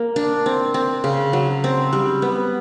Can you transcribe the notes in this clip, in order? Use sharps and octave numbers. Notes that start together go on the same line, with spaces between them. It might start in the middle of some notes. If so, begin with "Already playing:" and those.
Already playing: A#3
D4
C4
C4
C#3
F#3
C4
G3
B3